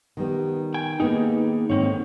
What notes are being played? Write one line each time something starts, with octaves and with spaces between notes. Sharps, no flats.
D#3 G3 B3
G5 G#5
A#3 B3 D#4 G#4
G#2 D3 D#3 C4 C#5